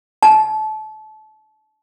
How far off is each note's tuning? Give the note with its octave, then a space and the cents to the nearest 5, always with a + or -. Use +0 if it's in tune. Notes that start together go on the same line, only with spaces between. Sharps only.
A5 -30